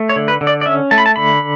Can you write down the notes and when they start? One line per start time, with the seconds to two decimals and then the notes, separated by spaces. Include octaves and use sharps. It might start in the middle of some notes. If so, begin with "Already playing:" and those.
Already playing: A3
0.09 C#5
0.16 D3
0.28 B4
0.41 D3
0.47 D5
0.61 D5
0.66 C#4 E5
0.91 A3 A5
0.98 B5
1.06 A5
1.16 D3 B5